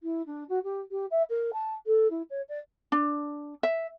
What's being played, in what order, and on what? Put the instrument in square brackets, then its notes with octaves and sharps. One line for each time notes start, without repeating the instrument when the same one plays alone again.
[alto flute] E4
D4
F#4
G4
G4
E5
A#4
A5
A4
E4
C#5
D5
[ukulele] D4
E5